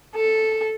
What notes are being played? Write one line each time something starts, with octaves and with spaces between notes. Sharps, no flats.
A4